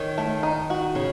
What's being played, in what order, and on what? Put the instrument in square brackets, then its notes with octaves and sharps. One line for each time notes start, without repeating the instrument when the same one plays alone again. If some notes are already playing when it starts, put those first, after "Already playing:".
Already playing: [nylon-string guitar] D#3 [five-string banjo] C#5
[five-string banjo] A3
D#4
F#4
[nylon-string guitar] C#3 [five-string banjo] C#5